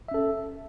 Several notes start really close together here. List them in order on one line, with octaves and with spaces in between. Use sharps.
E5 C#4 A4